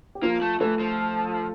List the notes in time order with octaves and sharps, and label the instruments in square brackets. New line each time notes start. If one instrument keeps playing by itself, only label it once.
[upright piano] G4
[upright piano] F3 F4 [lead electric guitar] A#3
[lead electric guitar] A3
[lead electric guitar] E3 [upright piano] A3 A4
[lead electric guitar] F3